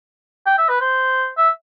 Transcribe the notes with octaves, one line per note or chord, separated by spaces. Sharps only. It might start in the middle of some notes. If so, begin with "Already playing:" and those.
G5
E5
B4
C5
E5